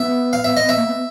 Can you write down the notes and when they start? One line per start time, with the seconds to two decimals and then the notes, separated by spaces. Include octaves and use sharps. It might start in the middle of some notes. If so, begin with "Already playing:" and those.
Already playing: B3 E5
0.33 F5
0.44 E5
0.57 D#5
0.69 E5
0.76 A#3
0.87 B3